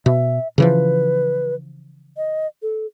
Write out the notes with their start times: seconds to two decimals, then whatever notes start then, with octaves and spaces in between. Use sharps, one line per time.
0.06 B2 E5
0.58 C#3 E3 F3 B4
2.17 D#5
2.62 A4